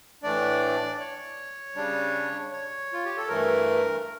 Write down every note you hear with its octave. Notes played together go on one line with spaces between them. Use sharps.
A2 E3 A3 D4 D5
C#5
C#3 G3 D4
C#5
F4
G4
A4
G2 E3 A3 A#4